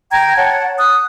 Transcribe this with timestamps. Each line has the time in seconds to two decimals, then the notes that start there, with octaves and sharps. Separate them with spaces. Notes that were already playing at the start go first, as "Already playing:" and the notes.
0.11 G5 A#5 G#6
0.36 C#5 F#5 A5
0.78 D#6 F#6